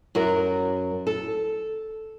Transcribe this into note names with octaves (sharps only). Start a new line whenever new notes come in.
F#2 F#4 A#4
A4